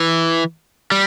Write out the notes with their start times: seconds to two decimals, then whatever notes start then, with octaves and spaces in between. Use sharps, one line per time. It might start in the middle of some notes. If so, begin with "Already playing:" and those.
Already playing: E3
0.92 G3